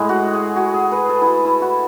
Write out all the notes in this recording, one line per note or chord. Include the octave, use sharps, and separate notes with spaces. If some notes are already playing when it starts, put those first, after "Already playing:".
Already playing: A2 G#3 E4
F#4
G#4
F#4
G#4
B4
A4
E4 F#4
E4
F#4